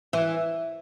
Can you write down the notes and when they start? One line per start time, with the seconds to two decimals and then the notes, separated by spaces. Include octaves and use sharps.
0.13 E3